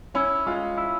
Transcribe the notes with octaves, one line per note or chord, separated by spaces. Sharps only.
C#4 E4
G#3 F4
E4